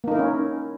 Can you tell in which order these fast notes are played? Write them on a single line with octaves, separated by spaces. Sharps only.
A#3 D#4 A#4 E4 C#4